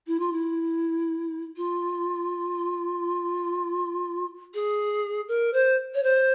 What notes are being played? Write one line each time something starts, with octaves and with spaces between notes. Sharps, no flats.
E4
F4
E4
F4
G#4
A#4
C5
C#5
C5